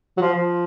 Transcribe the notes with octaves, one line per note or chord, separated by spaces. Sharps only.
F#3
F3
F3